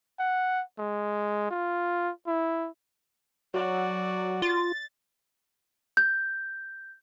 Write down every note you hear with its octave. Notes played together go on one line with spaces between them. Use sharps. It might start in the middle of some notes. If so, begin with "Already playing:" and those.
F#5
G#3
F4
E4
F#3 F#4 D5
F4 A6
G6